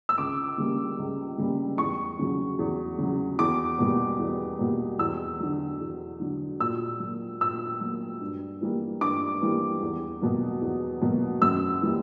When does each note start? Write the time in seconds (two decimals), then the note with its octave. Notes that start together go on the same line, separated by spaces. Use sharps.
0.09 E6
0.18 C#2 D6
0.58 C#3 G3 A#3
0.98 C#2
1.38 C#3 G3 A#3
1.78 E2 C#6
2.19 C#3 F#3
2.59 E2
2.98 C#3 F#3
3.39 E2 D6
3.79 B2 G3 A#3
4.19 E2
4.59 B2 G3 A#3
4.99 E2 E6
5.40 D3 F#3
5.80 E2
6.20 D3 F#3
6.60 A#2 E6
7.00 F#3
7.05 A#3
7.40 A#2 E6
7.81 F#3 A#3
8.21 G2
8.61 E3 G3 A#3
9.01 G2 D6
9.42 E3 G3 A#3
9.82 E2
10.21 B2 F#3 A#3
10.61 E2
11.01 B2 F#3 A#3
11.42 F#2 E6
11.82 E3 G3 A#3